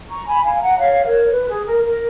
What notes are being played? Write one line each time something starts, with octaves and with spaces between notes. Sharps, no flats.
A#5 C#6
G#5 B5
F5 G#5
F#5 A#5
C#5 F5
A#4 C#5
B4
G#4
A#4
A#4